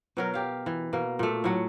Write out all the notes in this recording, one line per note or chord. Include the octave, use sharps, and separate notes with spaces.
B2 F#3 A#4
G4 F5
E3
B2 A#3
A#2 A3
A2 F#3 F#5